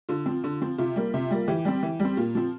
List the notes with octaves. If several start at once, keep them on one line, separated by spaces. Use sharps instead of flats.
D3 F4
F3 C4
D3
F3 C4
C3 F4
G3 A#3
C3
G3 A#3
E3 G4
G3 C4
E3
G3 C4
A#2 F4
F3 C4